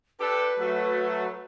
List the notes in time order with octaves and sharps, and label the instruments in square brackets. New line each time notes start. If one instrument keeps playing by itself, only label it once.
[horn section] D4 G4 A4 [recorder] B4
[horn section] F#3 A3